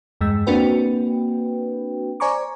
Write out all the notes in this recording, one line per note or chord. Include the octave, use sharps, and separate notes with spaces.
E2 G2 G#3 E6
A#3 C4 D4 F#4 B4 G5
C5 D5 G#5 A#5 C#6 D6